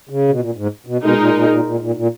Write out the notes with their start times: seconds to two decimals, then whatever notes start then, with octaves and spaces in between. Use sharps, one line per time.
0.09 C#3
0.28 B2
0.40 A#2
0.56 G#2
0.86 B2
1.02 B2 G#3 D#4 A#4
1.18 A#2
1.34 A#2
1.49 A#2
1.65 A#2
1.81 A#2
1.97 A#2